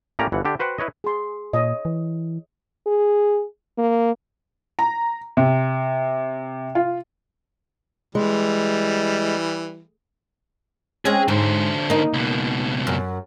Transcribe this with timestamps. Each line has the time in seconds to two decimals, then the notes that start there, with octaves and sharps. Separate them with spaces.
0.19 A2 A#3 C#4 G4 D5 A#5
0.32 G1 E3 F3 F#5
0.45 D3 D4 G4
0.59 F#4 B4 C5 F#5 G5
0.78 E4 B4 C#5 D#5
1.04 G#4 C6
1.53 A#2 C#5 D#5
1.85 E3
2.87 G#4
3.78 A#3
4.79 A#5
5.37 C3
6.75 F4
8.15 E3 G3 G#3
11.05 G#3 C4 C#4 G#4
11.28 G#2 D3 C5
11.90 A#3 D#4
12.13 C#2 B2
12.87 F#2